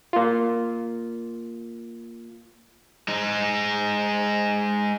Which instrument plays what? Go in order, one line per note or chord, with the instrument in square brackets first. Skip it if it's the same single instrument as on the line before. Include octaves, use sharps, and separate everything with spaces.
[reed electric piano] A#3 F4
[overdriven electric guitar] G#3 D#4